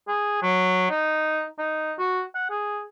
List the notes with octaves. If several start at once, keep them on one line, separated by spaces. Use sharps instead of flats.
G#4
F#3
D#4
D#4
F#4
F#5
G#4